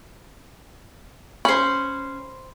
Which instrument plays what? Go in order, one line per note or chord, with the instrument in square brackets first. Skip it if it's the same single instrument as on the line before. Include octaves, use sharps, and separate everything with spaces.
[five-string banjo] C#4 [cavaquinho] C5 B5